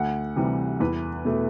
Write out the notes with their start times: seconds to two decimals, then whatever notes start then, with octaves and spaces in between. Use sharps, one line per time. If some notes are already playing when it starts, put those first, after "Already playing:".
Already playing: D2 F#5
0.36 C3 E3 G3
0.80 E2 B4
1.25 B2 A3